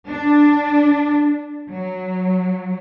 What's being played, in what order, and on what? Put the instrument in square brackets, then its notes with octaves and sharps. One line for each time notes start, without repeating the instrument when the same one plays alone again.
[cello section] D4
F#3